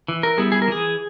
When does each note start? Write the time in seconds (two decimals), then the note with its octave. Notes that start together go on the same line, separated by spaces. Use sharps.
0.08 E3
0.23 A#4
0.38 G3 B3 E4 G#4
0.52 G#4
0.62 A#4
0.68 E3 G#4